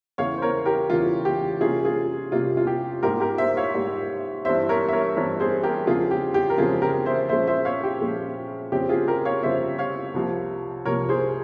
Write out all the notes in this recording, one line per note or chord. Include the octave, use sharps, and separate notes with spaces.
E2 C#3 E3 C#5 F5
C5
A#4 C#5
G4 A#4
E2 C#3 E3 F4
G4
C3 G3 A#3 C#4 F4 G#4
F4 G#4
C3 G3 A#3 C#4 F4
F4
G4
G#2 G3 A#3 G4 A#4
G4 A#4
C5 E5
C#5 F5
G#2 G3 A#3
G2 E3 G3 C4 C5 E5
A#4 C#5
E5
A#4 C#5
G2 E3 G3 C4 A#4 C#5
G#4 C5
G4 A#4
E2 C#3 F3 G#3 C4 F4 G#4
G4
G4
A#4
E2 C#3 F3 G#3 C4 F4 G#4
G4 A#4
C5 E5
A#2 F3 G#3 C#4 C5 E5
C5 E5
C#5 F5
G4
A#2 F3 G#3 C#4
F2 C#3 G3 C4 G4
F4 G#4
G4 A#4
C#5 F5
F2 C#3 G3 C4 C5 E5
C#5 F5
C2 C3 F3 A#3
C2 C3 F3 A#3 A#4 C#5
G#4 C5